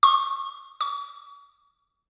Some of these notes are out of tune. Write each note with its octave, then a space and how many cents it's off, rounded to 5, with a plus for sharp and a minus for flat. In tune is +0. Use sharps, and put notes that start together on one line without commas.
C#6 -30
C#6 +40